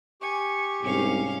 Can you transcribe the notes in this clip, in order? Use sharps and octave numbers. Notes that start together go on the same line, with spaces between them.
G4 G#5 C#6
C2 G#2 C#4 F5